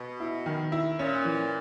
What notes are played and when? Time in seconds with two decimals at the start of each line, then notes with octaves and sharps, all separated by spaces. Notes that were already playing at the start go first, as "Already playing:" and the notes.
Already playing: B2
0.20 E4
0.46 D#3
0.72 E4
0.99 A#2 C#4
1.25 E3